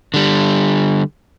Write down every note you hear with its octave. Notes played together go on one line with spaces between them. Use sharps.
D3 G3